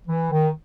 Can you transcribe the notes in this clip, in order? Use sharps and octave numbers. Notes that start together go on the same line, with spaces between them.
E3
D#3